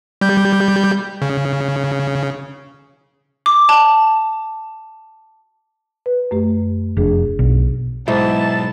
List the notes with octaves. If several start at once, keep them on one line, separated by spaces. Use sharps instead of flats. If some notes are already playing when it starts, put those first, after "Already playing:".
G3 G6
C#3
D6
A5
B4
F#2 A3 G4
F1 D4 G#4
B1
B1 G#2 E4 A5